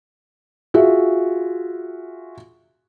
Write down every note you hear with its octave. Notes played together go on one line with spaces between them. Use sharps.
F4 F#4 G#4 E5